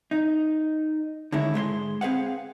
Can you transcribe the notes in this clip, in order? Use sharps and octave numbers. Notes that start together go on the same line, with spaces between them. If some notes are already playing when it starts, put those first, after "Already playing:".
D#4
D3 D#3 G#3 C#4 E4
G#2 G#3 C5 C6
C4 G#4 B4 F5 F#5